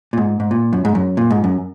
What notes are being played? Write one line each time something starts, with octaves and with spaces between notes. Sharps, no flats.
A#2
G#2
G#2
A#2
F#2
G#2
F#2
A#2
G#2
F#2